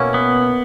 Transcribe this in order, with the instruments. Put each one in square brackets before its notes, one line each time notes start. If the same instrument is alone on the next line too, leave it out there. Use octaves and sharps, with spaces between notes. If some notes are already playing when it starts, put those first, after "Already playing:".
Already playing: [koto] B2 A#3 C#4 E4
[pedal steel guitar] B3